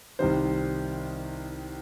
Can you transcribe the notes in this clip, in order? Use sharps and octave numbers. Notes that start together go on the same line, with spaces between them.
C2 C3 D#3 G3 C5